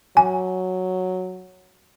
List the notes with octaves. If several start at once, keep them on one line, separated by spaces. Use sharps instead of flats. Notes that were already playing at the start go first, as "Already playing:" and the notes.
F#3 G#5